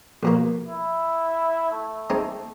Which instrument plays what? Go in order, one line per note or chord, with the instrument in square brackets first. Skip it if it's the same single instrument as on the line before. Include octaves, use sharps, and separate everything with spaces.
[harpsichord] A#1 B2 A#3
[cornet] E4
A3
[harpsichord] G#3 C4 D#4